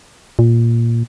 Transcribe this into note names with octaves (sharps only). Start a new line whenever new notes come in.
A#2